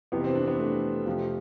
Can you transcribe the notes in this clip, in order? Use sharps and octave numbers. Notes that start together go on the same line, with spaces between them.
F2 C3 E3 B3
C4
D4
B3
A3
F2 C3 F3